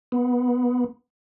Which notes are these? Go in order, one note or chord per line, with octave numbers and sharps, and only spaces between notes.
B3